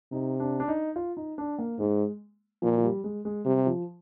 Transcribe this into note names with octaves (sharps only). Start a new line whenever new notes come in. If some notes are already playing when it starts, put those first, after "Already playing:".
C3 D#4
D4
D4
D#4
F4
D#4
D4
A#3
G#2 G#3
A#2 F3
F3
G3
G#3
G#3
C3 G3
F3